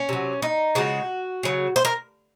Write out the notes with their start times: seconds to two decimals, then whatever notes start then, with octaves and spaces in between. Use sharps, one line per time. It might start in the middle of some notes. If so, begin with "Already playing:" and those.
Already playing: C#4
0.09 C3 F#3
0.42 D#4
0.75 C#3 F3 G#3 F#4
1.43 C#3 F#3
1.76 C5
1.85 A#4